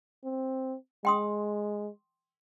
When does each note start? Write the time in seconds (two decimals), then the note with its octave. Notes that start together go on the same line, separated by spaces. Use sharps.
0.25 C4
1.05 G#3 G5 C6 D#6